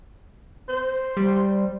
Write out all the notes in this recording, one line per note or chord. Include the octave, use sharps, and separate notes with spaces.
C5
G3